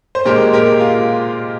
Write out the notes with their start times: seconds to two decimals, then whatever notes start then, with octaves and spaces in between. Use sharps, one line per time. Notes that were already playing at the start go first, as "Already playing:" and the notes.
0.15 C5
0.26 A#2 G#3 G4 A#4
0.53 G4 A#4
0.80 F4